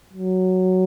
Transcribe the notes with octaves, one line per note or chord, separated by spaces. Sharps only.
F#3